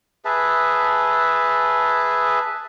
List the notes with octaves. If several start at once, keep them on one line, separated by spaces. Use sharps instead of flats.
G#4 B4 E5 A5